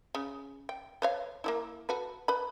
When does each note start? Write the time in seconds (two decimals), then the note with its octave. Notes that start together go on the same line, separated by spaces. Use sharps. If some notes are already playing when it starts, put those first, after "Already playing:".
0.15 C#3
0.69 G5
1.02 B4 C#5 F5
1.44 A#3 B3 E4
1.89 F#4 A4 B4
2.28 B4 B5